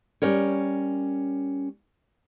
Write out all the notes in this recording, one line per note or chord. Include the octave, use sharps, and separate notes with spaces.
G3 C#4 A#4 C#5